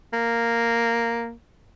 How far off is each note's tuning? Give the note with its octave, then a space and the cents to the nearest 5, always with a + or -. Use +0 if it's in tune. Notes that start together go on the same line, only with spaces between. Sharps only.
A#3 -5